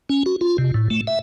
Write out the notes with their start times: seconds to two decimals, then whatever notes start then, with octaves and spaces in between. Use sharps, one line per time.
0.09 C#4
0.26 F#4
0.41 F4
0.58 C3
0.74 A2
0.90 A3
1.07 E5